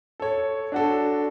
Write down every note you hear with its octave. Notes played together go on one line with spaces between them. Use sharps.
A4 C#5
D4 F#4 A4